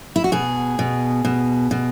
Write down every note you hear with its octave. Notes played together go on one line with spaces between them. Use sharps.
E4
F#4
B2 G#4
B2
B2
B2